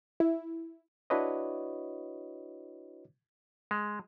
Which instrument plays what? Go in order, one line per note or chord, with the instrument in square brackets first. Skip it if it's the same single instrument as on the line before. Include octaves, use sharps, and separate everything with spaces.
[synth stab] E4
[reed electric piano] D4 E4 F#4 B4 C#5 D#5
[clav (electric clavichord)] G#3